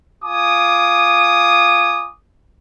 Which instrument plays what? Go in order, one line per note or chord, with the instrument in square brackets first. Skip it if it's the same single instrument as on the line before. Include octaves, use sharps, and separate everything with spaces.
[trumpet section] F4 G#5 D6 D#6